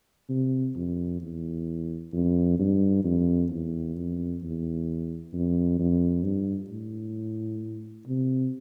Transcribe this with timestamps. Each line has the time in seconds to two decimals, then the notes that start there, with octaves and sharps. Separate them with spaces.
0.29 C3
0.76 F2
1.22 E2
2.13 F2
2.59 G2
3.04 F2
3.51 E2
3.95 F2
4.42 E2
5.33 F2
5.79 F2
6.24 G2
6.70 A2
8.07 C3